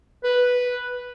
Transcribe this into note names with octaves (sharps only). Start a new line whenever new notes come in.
B4